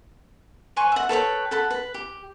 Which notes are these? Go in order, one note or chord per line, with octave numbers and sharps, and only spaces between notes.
B4 C5 G#5 C#6
E5 F#5
A4 B4 C#5 G5
A4 F#5 B5
B4
G4